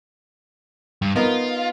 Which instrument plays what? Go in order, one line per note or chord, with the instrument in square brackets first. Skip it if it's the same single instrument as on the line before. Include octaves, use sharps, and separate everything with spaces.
[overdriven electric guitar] G2
[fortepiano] B3 D#4 A#4 [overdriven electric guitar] F4